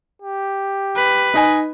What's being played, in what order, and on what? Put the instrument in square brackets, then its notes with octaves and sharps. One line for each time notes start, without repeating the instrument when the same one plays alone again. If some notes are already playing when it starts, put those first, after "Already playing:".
[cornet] G4
[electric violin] B4
[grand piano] D#4 D#5 G#5